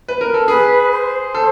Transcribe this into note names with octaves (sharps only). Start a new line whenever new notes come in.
B4
A#4
A4
G#4 B4
C5
A4